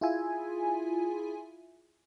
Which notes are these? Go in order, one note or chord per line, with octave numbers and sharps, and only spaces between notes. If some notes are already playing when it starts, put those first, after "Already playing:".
E4 F4 G#4 E5 G#5